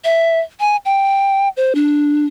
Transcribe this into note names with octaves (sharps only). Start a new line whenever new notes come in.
E5
G#5
G5
C5
D4